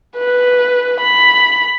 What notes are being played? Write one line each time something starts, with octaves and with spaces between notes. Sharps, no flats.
B4
B5